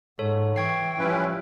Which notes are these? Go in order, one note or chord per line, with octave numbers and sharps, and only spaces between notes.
G#2 A4 C#5
E3 G5 C#6 G#6 C7
F3 G3 C#4 E4 B4